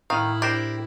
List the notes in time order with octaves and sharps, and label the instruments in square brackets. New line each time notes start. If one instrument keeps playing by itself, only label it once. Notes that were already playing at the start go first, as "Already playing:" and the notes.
[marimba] A2 [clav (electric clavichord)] D#3 [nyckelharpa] E4 [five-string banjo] F5
[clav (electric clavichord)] D4 A#4 C5 [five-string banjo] G4